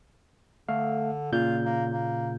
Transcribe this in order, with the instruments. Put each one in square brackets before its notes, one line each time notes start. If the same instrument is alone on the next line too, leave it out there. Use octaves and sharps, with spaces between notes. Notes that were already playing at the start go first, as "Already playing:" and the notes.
[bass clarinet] D3 [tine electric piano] A3 F5
[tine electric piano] A#2 C#3 G6 [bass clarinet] F4
[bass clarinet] A#3
A#3